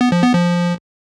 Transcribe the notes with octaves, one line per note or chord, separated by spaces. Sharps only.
B3
F3
B3
F3